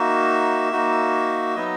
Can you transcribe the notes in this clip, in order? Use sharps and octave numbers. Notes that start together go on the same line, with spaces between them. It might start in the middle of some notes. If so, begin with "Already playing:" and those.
Already playing: A#3 D#4 F#4 E5
A#3 D#4 F#4
F#3 B3 D#4 D#5